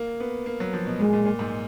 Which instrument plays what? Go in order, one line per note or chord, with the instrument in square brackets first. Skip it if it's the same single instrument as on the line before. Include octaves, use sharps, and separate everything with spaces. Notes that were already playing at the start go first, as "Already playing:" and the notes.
Already playing: [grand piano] A#3
B3
A#3
F#3
F3
B2
[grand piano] A#2 [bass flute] G#3
[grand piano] A#2
A#2
G#2